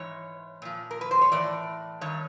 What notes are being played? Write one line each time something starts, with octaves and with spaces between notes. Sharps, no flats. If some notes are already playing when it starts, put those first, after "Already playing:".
Already playing: G#2 E3 C#5
A#2 F3
A#4
B4
C5
C#5
A2 E3 D5
G2 D#3 C#5